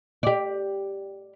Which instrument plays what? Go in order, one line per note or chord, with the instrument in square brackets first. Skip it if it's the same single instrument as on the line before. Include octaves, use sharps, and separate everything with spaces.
[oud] G4 D5